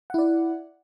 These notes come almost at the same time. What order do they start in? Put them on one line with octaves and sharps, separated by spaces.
F#5 E4 D5